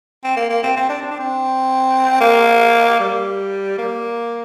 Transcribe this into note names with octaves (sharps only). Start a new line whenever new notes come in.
C4
A#3
A#3
C4
C4
D4
C4
D4
C4
A#3
G3
A#3